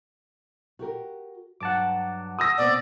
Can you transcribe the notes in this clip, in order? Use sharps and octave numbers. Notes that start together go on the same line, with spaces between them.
F#4 G4 A#4
G2 F#3 F#5 A5 D6
D#6 E6 A#6
B2 B3 C4 D5